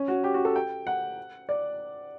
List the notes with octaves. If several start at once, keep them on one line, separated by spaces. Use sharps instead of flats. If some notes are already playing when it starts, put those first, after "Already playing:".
Already playing: C#4
F#4
G4
F#4
A4
G5
F#5
D5